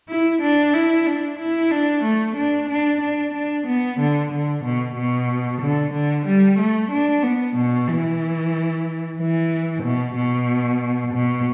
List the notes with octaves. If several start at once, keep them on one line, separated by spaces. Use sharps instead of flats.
E4
D4
E4
D4
E4
D4
A3
D4
D4
D4
D4
B3
D3
D3
B2
B2
D3
D3
G3
A3
D4
B3
B2
E3
E3
B2
B2
B2